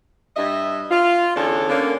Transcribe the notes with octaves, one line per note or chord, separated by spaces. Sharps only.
G2 D#5 E5
F4
E2 D3 C#4 A4 C#5 D5
D3 A#3 C#4